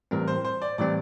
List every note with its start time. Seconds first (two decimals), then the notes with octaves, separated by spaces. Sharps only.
0.11 A2 E3 G3 C4 A#4
0.28 C5
0.45 C5
0.62 D5
0.78 A2 E3 G3 C4 D5